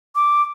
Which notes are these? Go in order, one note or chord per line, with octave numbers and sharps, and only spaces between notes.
D6